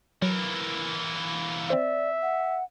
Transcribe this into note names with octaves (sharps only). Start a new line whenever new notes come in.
E3 F#3 A#3
C4 C5 D5 E5
F#5